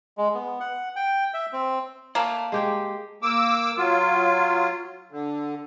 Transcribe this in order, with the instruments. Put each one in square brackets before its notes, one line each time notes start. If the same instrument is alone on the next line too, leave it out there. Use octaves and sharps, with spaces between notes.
[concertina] G#3
B3
F#5
G5
E5
C4
[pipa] A#3 [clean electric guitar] D5 E5 A5
[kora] G#3 G4 G5
[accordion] A#3 D6 E6
F#3 F4
D3